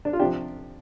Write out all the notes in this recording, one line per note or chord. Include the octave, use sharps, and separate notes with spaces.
D4
F4
C3 F3 D4 G4